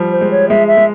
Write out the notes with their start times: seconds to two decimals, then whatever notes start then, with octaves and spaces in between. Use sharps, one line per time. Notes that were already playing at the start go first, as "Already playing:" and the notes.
Already playing: F3 G3
0.11 C5
0.21 G#3
0.31 C#5
0.49 G#3 E5
0.68 E5
0.77 G#3